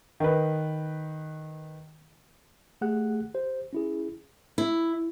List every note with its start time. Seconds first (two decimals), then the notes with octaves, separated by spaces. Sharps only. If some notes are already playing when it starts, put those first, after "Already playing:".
0.20 D#3 B4
2.81 A3 G4 G#4 F#5 F#6
3.35 G4 C5
3.73 C#4 E4 G#4
4.58 E4